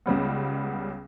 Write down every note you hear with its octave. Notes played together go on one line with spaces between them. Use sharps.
C#2 C#3 G3 B3